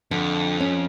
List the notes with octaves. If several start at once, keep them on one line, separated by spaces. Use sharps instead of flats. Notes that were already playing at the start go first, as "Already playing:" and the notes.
F2 D3
C#4